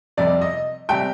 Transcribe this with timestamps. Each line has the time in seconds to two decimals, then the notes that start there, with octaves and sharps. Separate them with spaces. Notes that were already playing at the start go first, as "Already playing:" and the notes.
0.17 F2 C3 G3 D5
0.42 D#5
0.89 C3 G3 G5